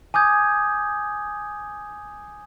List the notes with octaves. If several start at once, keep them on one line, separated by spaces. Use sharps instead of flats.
G#5 D6 D#6 G6 G#6